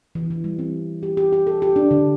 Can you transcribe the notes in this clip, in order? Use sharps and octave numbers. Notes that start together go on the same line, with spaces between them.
E3
E3
G3
C4
G4
G4
G4
A4
G4
D4
D3